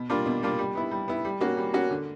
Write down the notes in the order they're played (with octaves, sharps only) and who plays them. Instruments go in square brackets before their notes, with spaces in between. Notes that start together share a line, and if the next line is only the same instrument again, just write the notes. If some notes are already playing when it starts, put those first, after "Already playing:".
Already playing: [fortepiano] B2
G3 A#3 D4 F4
B2
G3 A#3 D4 F4
G3
B3 E4
G3
B3 E4
G3
A#3 C#4 F#4
G3
A#3 C#4 F#4
D3